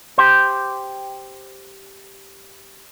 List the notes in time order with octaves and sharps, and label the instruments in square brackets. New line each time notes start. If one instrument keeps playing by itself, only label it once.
[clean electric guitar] G4 C5